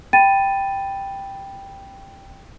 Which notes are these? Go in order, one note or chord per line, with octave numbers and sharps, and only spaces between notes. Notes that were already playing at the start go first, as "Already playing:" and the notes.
G5 B5 A6 D#7